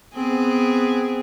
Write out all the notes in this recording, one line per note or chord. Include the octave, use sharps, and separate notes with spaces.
B3 C4 G#4